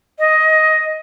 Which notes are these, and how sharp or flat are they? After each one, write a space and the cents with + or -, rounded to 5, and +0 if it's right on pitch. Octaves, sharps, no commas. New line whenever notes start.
D#5 +10